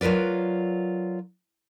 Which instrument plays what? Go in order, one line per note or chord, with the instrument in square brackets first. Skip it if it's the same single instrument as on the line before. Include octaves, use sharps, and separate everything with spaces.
[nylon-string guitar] F#3 F4 A#4 B4 D5